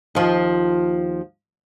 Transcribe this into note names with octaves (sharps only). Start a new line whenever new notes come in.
D#2 F3